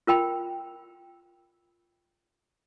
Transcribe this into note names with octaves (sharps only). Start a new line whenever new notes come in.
F4 A#4 G5 B5